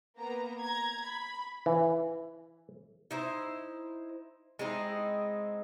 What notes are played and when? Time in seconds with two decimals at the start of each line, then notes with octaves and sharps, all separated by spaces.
0.17 A#3 B3 A#5
0.61 A#5 G#6
1.06 B5
1.66 E3
3.11 D#4 E4 C5
4.59 G#3 C4 D#4 E4